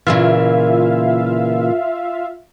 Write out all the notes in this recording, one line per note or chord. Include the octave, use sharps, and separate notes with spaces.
A#2 C#3 E3 F4 E5 F5